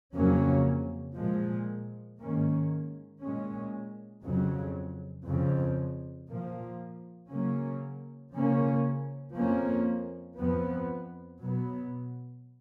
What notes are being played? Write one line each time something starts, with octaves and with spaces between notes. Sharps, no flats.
F2 C#3 F#3 A#3 C#4
A#2 F3 G#3
G#2 D#3 A#3 C#4
A#2 G#3 C#4
F2 C#3 F#3
F2 C#3 F3
A#2 F3 A#3
C#3 F#3 A#3 C#4
C#3 F3 A#3 C#4
F2 F3 A#3 C#4
F2 F3 B3
B2 F#3 B3